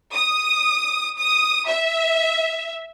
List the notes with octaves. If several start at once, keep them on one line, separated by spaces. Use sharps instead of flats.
D#6
D#6
E5